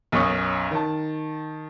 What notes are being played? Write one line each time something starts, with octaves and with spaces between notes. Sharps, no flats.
B1 F#2 C#4 C#6 D#6
D#3 A5